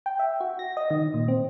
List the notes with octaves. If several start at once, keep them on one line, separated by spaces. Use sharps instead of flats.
G5
E5
F#4
A#6
D#5
D#3
A#2
C4